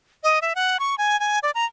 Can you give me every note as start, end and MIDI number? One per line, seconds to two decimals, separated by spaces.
0.24 0.39 75
0.42 0.53 76
0.55 0.77 78
0.80 0.95 85
0.98 1.19 80
1.20 1.39 80
1.43 1.51 74
1.55 1.65 82